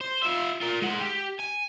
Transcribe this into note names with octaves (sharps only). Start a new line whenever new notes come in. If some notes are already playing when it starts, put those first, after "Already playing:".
C5
F4 E5
F4 A#4
G#3 F#5
G4
G#5